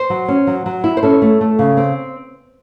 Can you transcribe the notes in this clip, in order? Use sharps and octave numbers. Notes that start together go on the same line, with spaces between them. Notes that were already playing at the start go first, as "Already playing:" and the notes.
Already playing: C5
F#3
C#4
F#3
F#3
E4
C5
C#4 A4
A3
A3
C#3
C4